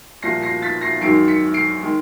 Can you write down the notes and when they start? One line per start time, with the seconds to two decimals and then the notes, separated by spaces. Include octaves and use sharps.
0.23 C2 A#2 F3 A#6 C7
0.43 A#6 C7
0.62 A6 B6
0.81 A#6 C7
1.01 F#2 D#3 G#3 C7 D7
1.28 B6 C#7
1.54 C7 D7
1.82 D#3 G#3